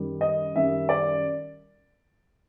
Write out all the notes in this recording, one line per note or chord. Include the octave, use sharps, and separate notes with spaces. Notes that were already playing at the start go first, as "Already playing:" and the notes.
Already playing: F#2 D#3 G3
D#5
F#2 D#3 G3 E5
D5